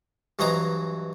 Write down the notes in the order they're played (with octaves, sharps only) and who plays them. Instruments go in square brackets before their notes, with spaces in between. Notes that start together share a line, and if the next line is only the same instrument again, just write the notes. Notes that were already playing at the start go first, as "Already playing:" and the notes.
[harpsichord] G2 E3 F#3 C5 D#5 A#5